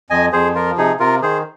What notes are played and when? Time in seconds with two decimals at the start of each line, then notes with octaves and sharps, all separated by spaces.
0.10 F2 D#5 G#5
0.33 F2 G#4 C5
0.55 F3 F4 A#4
0.78 C3 D#4 G#4
1.00 C3 F4 A#4
1.22 D#3 G#4 C5